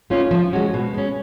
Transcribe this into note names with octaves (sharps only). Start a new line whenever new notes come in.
A3 C#4 F4
F3
G#3 C#4 F#4
B2
G#3 C#4